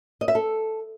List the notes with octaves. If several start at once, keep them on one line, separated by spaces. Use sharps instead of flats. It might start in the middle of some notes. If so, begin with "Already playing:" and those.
D#5
E5
A4